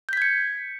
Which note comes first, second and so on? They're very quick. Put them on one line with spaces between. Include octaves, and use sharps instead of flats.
G6 B6 G#6 C#7